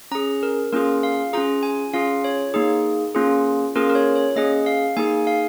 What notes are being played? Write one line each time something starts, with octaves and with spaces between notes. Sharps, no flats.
C#4 G#4 A#5
A#4
A#3 C#4 F4 G#4 A#4
F5
C#4 F4 G#4 A#5
G#5
C#4 F4 G#4 F5
C#5
A#3 D#4 G#4
A#3 C#4 F4 G#4
A#3 C#4 F4 G#4 A#4
A#4
C#5
C#5
A#3 C#4 G#4 D#5
F5
A#3 D#4 G#4 G#5
G#5
F5